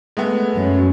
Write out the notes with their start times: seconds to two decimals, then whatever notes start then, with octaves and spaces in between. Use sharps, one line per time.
0.17 G#3 A3 B3
0.55 F#2